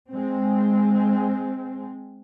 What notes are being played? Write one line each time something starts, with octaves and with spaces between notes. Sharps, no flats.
G#3 C4